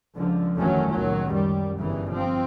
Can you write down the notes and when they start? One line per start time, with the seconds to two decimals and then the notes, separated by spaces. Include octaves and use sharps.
0.16 C#2 D3 F3
0.58 F#1 E2 D#3 F#3 A3 C#4
0.92 C#2 A#2 D#3 F#3
1.29 F#2 G3
1.78 G1 C#3 E3
2.11 F3 C4